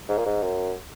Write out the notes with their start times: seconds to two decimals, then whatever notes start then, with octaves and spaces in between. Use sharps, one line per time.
0.09 G#2
0.18 A#2
0.26 G#2
0.43 F#2